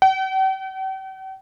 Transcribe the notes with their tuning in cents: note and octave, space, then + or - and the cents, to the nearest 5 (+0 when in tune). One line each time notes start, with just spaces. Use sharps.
G5 -45